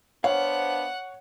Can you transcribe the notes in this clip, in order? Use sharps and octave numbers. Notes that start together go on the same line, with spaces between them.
B3 D4 C5 C#5 F5 F#5